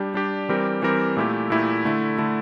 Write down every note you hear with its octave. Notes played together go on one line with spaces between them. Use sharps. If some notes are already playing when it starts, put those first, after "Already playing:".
Already playing: G3 D4 G4
G3 D4 G4
E3 G3 C4 G4 A#4
E3 G3 C4 G4 A#4
A#2 A3 E4 G4
A#2 A3 E4 G4
D3 A3 E4
D3 A3 E4